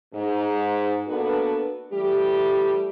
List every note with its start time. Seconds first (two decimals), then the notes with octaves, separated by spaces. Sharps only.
0.13 G#2
1.07 A#3 B3 D4 F#4 A4 B4
1.91 E3 G3 A3 G4